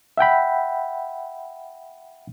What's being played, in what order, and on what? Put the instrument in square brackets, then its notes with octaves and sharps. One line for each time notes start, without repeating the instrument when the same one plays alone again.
[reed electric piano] E5 F#5 G5 B5